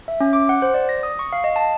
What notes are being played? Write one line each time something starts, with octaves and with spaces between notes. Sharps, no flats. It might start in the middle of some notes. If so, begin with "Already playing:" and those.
E5
C#4
D6
F#5
C5
D5
A#6
D#6
C#6
F5
D#5
A5